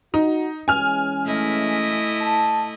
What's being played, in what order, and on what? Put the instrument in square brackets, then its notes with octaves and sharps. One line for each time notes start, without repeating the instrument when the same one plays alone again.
[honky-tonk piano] D#4 [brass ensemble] F#4
[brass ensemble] E3 G#3 C#4 [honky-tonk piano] G#5 F6
[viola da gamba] A3 E4 D#5
[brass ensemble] A5